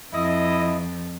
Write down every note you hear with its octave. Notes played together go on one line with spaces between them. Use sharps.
F2 E4 D#5